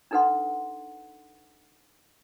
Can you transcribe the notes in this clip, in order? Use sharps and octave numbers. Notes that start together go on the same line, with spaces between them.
D4 D#4 A4 B4 F#5 C6